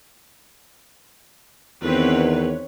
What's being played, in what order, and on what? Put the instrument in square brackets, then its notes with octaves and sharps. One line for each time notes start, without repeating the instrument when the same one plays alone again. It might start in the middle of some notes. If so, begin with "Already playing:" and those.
[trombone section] E2 D#3 [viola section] C4 B4 C#5